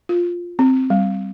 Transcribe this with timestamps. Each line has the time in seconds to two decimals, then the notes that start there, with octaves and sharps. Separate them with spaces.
0.09 F4
0.59 C4
0.90 G3